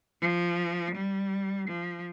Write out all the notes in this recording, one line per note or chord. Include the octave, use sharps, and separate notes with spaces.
F3
G3
F3